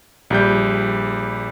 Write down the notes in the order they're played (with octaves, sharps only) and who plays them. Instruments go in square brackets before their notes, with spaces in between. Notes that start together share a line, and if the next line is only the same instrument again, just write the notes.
[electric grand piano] A#1 G3 G6